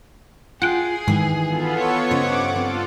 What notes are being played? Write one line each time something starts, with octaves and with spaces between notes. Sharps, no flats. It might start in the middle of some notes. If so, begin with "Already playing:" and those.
F4 G#4 F#5 G5
G#2 D#3 E3
B3 F4 A4
C#5
G2 C#3 C5 D#5 F#5 D6
C4 F4 A4